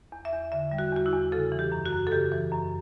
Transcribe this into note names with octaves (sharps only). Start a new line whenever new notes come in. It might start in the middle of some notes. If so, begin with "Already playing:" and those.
E2
E5
E2
D3 E5
G3
F#4
E2 F#4
E4
E2
C#3 A4
E3
G4
F#2
F#4
F#2
A4
C#3 G4
E3
F#2